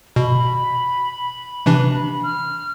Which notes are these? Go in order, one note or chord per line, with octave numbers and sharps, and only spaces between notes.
B2 B5
C3 E3 D4
F6